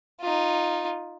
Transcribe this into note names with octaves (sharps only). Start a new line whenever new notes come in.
D#4 F4